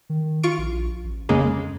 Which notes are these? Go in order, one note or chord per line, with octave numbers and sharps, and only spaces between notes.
D#3
F4 C#6 D7
A#1
A1
F2 C#3 G#3 A#3